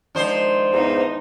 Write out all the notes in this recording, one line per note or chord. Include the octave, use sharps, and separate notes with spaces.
D#3 F3 G#3 D4 C5
E2 G#2 D#4